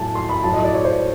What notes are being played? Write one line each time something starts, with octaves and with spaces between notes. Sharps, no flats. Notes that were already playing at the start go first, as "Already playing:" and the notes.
Already playing: A2 F#3 G#5 A5
C6
B5
A2 F#3 A5
D#5
D5
C#5
C5